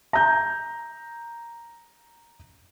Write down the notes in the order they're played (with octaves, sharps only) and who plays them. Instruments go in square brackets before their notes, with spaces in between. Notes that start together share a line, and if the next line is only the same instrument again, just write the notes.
[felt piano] A#5 G6